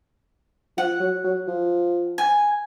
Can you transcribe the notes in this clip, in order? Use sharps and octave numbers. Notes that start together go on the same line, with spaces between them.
F3 F#5
F#3
F#3
F3
G#5